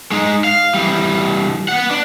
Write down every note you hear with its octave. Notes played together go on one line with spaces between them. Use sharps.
G#3 D#4
F5
E3 G3
B3 F#5
D4